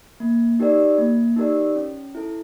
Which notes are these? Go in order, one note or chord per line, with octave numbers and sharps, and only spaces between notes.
A#3
D#4 G4 A#4 D5
A#3
D#4 G4 A#4 D5
C#4
E4 A4